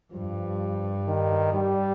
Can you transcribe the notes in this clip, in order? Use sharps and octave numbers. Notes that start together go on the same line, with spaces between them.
G2 F3
D#3
G3